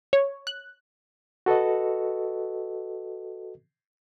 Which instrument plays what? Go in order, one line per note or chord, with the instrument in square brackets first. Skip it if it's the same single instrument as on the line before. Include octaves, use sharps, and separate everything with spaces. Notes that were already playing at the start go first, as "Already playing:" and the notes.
[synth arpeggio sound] C#5
F#6
[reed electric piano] F#4 A4 B4 D#5